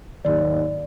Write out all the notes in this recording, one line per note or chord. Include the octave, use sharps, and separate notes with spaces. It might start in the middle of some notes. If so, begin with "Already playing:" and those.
D#2 G#2 D#3 F#3 D5